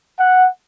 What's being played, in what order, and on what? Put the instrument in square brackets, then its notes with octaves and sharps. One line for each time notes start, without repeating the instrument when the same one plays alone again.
[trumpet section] F#5